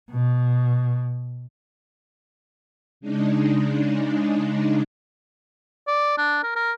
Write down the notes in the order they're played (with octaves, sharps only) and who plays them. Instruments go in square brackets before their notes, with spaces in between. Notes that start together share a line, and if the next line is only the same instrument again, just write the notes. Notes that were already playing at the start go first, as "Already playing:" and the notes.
[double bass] B2
[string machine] C#3 G#3 D4 D#4
[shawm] D5
D4
A#4
A#4